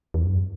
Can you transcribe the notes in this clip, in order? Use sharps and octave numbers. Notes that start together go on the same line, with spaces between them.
E2
F#2